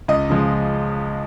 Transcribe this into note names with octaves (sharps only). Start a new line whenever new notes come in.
C#2 D#5
C#3 F3 G#3